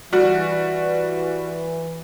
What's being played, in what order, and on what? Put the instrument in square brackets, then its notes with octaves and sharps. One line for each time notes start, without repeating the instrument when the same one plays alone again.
[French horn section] E3 [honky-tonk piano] G3 F#4